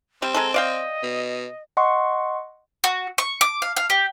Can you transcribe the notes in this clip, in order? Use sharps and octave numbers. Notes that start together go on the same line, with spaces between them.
G3 C4
G#3 G#4 A4 A#5
D5 D#5 F5 G5
B2
D#5 F#5 C6 C#6
F#4
C#6
D6
F5
F5
G4